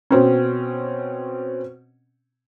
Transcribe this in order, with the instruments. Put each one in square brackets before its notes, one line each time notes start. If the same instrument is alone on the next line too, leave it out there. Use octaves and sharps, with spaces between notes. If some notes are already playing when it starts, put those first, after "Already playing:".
[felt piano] B2 C4 C#4